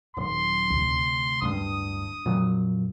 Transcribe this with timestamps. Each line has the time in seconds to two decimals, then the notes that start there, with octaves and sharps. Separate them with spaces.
0.17 D#1 F#3 C6
0.70 D2 C3
1.42 D1 G2 D4 D#6
2.26 F2 A#2 F#3